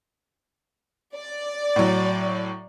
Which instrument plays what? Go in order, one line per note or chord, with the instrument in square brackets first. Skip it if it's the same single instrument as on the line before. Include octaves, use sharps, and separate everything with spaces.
[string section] D5
[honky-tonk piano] A2 F#3